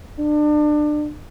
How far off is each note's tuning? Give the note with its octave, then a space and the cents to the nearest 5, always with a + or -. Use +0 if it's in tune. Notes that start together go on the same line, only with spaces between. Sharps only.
D4 +30